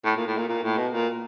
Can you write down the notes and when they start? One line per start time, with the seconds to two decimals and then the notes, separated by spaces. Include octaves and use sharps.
0.05 A2
0.16 A#2
0.27 A2
0.37 A#2
0.49 A#2
0.63 A2
0.77 B2
0.92 A#2